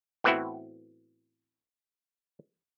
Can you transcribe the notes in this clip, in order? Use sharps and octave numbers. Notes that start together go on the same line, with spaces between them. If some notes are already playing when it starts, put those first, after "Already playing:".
A2 E3 B3 C4 E4 F#4